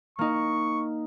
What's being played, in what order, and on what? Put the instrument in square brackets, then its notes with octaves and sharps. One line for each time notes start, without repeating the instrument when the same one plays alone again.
[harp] A#3 D#4 [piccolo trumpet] C#6